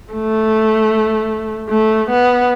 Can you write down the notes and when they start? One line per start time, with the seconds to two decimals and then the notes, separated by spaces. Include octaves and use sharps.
0.14 A3
1.70 A3
2.10 B3